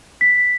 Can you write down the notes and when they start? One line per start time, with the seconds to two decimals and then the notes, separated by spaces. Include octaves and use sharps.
0.21 B6